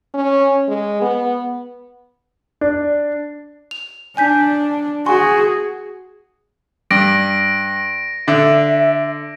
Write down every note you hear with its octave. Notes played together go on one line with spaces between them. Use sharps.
C#4
G#3
B3
D4
F7
D4 G#5 G6 B6
F#4 G#4 G#5 C6 C#6
G2 A#6 D7
D3 E5